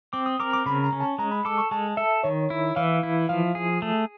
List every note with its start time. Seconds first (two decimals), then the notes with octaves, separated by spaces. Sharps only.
0.13 C4 D6
0.26 D#6
0.40 A#4 D6
0.53 D6
0.66 C#3 B5
0.84 A#5
0.93 C#4
1.01 A5
1.18 G#3 A#5
1.31 B5
1.45 A4 D6
1.58 C#6
1.71 G#3 A5
1.97 A4 E5
2.23 D#3 C#5
2.50 E4
2.76 E3 F5
3.03 E4
3.29 F3 F5
3.55 G#4
3.82 A3